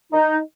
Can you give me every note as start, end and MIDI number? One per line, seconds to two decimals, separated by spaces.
0.13 0.38 63